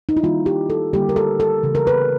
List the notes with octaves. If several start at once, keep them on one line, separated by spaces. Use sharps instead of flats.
D#4
E4
D#3 G3 A#3 F4
G4
A4
D3 G3 A#3 G4
A#4
A4
A4
C#3 E3 A3
A#4
B4